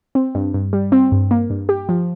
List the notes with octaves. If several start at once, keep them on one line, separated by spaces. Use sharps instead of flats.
C4
G2
G2
G3
C4
G2
A#3
G2
G4
F3